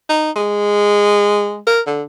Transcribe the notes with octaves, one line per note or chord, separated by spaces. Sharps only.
D#4
G#3
A#4
D3